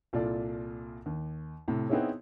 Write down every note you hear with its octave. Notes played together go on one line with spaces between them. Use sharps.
C2 A#2 F4 A4 D5
D#2
A2 C3
B3 C4 D#4 E4 G#4 C#5